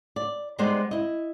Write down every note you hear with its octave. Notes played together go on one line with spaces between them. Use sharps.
D5
G3 G#3 B3 D#4 C5 D5
E4 D#5